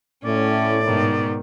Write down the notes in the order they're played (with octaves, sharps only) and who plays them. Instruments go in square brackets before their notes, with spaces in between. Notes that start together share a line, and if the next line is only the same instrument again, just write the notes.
[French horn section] A2 [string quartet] C#4 [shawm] D5
[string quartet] G#2 B2 D#3